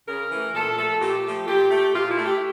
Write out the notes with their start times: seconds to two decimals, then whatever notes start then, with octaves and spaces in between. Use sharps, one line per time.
0.08 C#3 A#4
0.32 E3 A3
0.55 A#2 A4
0.78 F3 A3 A4
1.01 A#2 G4
1.25 F3 A3
1.47 A#2 G4
1.71 A3
1.94 A#2 F4
2.10 E4
2.17 A3
2.25 G4